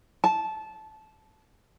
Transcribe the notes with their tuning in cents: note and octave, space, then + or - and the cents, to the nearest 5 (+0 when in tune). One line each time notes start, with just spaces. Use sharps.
A5 -15